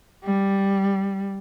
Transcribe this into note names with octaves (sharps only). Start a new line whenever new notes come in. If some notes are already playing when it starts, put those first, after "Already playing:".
G3